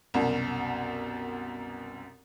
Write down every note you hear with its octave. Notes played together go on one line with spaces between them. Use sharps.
C2 F#2 B2